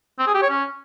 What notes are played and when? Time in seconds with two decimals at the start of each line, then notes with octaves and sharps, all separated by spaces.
0.19 C4
0.27 G#4
0.34 G4
0.42 C#5
0.50 C#4